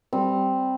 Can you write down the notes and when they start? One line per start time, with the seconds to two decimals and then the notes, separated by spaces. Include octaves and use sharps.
0.13 G3 C4